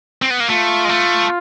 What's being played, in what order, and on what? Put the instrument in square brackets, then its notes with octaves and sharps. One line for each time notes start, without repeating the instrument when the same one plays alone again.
[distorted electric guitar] C4
B3
A#3
[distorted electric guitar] A3 [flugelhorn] F4
[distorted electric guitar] G#3
A3